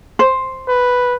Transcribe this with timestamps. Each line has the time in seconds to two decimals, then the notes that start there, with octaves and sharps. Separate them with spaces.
0.19 C5
0.69 B4